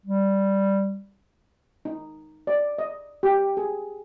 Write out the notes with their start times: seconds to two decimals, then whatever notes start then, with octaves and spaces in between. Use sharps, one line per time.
0.05 G3
1.85 D#4
2.47 D5
2.78 D#5
3.23 G4
3.57 G#4